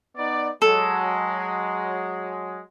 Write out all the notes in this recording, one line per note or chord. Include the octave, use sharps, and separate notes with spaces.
B3 D#4 D5
F#3 G#3 A4